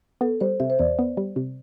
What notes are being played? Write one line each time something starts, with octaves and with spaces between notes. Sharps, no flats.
B3 A4
G3 C5
C3 E5
C5
E2 D5
B3
G3
C3